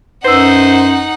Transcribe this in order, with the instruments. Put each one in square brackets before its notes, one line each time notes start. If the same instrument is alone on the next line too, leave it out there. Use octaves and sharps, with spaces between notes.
[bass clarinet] F#2 [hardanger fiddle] D#4 F#5 [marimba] B4 E6 [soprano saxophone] C5